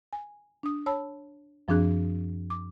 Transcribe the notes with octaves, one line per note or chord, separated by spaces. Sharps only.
G#5
D4 D#6
C#5 A5 B5 E6
F#2 F3 C4 D4 G#4 F#6
D6